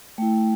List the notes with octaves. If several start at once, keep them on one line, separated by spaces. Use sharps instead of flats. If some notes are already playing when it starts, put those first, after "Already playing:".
A3 E4 G5